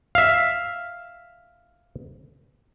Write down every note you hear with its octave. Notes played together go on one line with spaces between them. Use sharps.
E5 F5